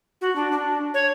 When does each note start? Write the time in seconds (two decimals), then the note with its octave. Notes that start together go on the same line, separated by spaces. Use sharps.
0.21 F#4
0.36 D4
0.52 D4
0.94 C#5